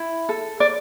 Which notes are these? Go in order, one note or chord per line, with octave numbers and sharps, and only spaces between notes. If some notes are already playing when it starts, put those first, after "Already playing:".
Already playing: E4
A4
D5